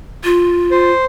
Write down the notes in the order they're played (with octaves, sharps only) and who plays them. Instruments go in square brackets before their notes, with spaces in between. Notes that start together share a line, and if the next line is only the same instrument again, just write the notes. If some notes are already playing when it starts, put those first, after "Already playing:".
[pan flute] F4
[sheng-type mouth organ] C5